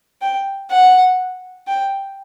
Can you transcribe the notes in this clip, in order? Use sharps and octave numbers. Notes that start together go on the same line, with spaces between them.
G5
F#5
G5